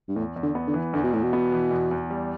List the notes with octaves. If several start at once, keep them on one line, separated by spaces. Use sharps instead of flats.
G2
E2 A2
E2
D3
B3
D3
E3
E2 D3
B2
E2 A2
B2
B3
E3
E2
E2
G3